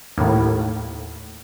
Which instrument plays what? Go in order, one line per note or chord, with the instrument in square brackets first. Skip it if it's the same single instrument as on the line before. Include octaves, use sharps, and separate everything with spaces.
[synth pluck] D#2 A2